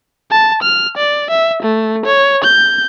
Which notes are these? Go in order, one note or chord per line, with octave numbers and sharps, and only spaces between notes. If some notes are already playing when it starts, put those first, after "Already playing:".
A5
F6
D5
E5
A3
C#5
G6